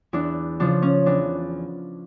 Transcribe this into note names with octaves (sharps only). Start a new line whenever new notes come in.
E2 D4 E4
C#3 F3 D4
C#4
E2 D4